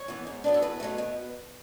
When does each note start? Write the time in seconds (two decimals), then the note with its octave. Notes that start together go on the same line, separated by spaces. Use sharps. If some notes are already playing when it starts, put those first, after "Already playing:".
Already playing: C#5
0.08 E3 B3
0.27 G#2
0.44 F#3 B3 D4
0.54 A4
0.62 E2 B4
0.80 B2 F#3 A3
0.98 B2